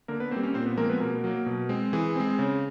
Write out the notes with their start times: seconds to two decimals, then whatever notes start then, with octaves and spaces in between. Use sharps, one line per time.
0.08 D3 A#3 A#4
0.20 B3 B4
0.31 A#3 C4 C5
0.36 G3
0.43 C#4 C#5
0.54 A#2 C4 C5
0.66 B3 B4
0.77 F3 G#3 A#3 C4 A#4
0.89 B3 B4
1.00 B2 A#3 A#4
1.24 F#3 A#3
1.46 B2
1.69 G#3 C4
1.93 E3 G#4
2.16 G#3 C4
2.39 C#3